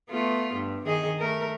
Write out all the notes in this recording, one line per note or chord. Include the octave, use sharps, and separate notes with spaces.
A3 B3 F4
G2
D#3 G#4 D#5
A3 A#4